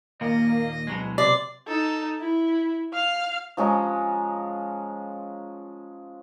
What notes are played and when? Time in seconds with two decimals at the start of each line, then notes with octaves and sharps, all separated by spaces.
0.21 D#2 A#2 A#3 D#5
0.87 D1 B2 F#3 G#3
1.18 C3 D5 C6
1.68 D#4 A4
2.20 E4
2.93 F5 F6
3.57 F3 G#3 C#4 A#5